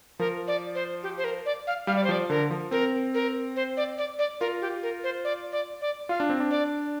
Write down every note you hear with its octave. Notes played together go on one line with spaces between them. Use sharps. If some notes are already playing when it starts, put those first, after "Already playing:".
F3 A#4
D5
C5
G4
C5
A#4
D5
F5
G3 F5
D5
C5
F3 D5
D3 A#4
F3
C4 A#4
A#4
C5
D5
D5
D5
F4 A#4
G4
A#4
C5
D5
D5
D5
F4 F5
D4
C4
D4
D5